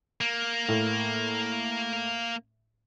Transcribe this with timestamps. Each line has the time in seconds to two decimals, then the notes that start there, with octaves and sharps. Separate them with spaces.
0.21 A#3
0.68 A2